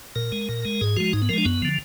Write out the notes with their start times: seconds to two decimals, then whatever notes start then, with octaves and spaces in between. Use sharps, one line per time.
0.16 A#2 A#4
0.32 G#3
0.49 A#2
0.65 G#3
0.81 G#2 G#4
0.96 F3 G#3 F#4
1.13 G#2 D#4
1.22 B3
1.29 F3 A#4
1.33 G#3 D4
1.45 F#2 B3
1.62 D3 F3